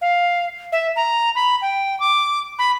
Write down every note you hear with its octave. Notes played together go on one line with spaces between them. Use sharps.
F5
E5
A#5
B5
G5
D6
B5